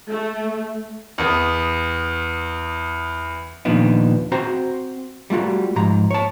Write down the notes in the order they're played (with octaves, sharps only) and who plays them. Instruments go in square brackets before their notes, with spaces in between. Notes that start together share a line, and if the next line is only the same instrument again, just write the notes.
[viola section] A3
[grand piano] E2 B3
[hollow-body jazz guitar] D#2 A#2 F3 B3 D4 D#4
C4 F#4 C5 A#5
G3 A3 F4 F#4
G#2 F3 A#5
C#5 A5